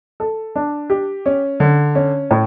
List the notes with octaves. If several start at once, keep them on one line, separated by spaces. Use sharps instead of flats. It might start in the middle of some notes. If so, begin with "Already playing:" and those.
A4
D4
G4
C#4
D3
C#4
A2